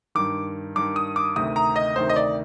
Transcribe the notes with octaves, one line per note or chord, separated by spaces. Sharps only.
G2 D#3 D6
G2 D#3 D6
D#6
D6
D2 C3 D#3 D#6
A#5
D#5
D2 C3 D#3 C5
D#5
D5